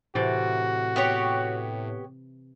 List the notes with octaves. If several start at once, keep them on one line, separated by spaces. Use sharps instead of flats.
A2 C3 E3 F#4 D5
B3 G4 C#5